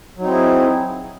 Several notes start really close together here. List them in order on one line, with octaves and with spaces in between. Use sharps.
F#3 D#4 C4 E4 G#4